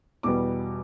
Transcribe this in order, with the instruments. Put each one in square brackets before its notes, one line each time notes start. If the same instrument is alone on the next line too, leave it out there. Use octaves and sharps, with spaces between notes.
[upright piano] E2 B2 G3 B3 D6